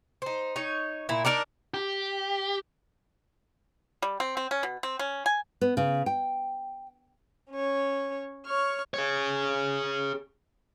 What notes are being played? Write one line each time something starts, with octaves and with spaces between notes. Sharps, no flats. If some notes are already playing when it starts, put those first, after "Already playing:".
D#4 C5
D#4 C#5
A#2 E4
D4 D#4 A#4 D5
G4
G3
C4
C4
C#4
B2
C4
C#4
G#5
B3
C#3
G5
C#4 C#5
C#5 C#6 F6
G#4 C#5